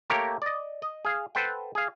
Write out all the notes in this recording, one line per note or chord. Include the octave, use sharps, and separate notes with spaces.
A3 A#3 G4 A#4 C#5
D5 D#5
D#5
G#4 F5
A4 B4 C5 F#5 G5
G#4 F5